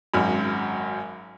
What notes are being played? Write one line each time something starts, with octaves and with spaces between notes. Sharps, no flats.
G#1 F#2